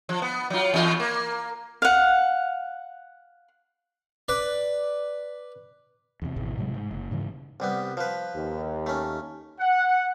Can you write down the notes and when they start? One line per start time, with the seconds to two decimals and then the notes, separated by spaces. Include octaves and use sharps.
0.09 F3
0.22 B3
0.50 F#3 F4
0.74 E2 F4
1.00 A#3
1.82 F5 F#5
4.28 B4 D5
6.22 E2 C3
6.36 G#1 E2 B2 E3
6.57 A2 C3 F#3 G#3
6.74 G#2
6.91 F#1
7.11 G#2 C#3 E3
7.60 C2 G3 B3
7.97 F3 B4
8.34 D#2
8.86 A3 C#4
9.60 F#5